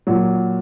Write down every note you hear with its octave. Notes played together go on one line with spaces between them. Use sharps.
A#2 F#3